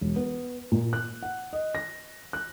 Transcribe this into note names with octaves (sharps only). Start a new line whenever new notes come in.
E1
B3
A#2
F#6
F#5
D#5
A#6
F#6